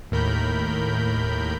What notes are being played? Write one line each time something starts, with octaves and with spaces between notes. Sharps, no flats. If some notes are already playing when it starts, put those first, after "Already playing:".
D#2 A2 A#4 B5 G6